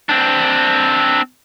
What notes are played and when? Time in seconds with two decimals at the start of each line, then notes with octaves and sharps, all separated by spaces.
0.09 C4 D4